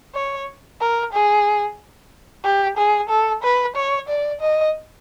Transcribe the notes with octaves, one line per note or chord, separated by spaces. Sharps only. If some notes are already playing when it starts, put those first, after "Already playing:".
C#5
A#4
G#4
G4
G#4
A4
B4
C#5
D5
D#5